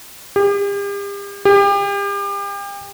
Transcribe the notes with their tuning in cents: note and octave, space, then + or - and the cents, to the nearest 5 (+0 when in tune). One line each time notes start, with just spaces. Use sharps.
G4 +40
G4 +35